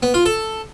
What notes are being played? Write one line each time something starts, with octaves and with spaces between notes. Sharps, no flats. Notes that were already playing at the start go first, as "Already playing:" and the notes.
B3
F4
A4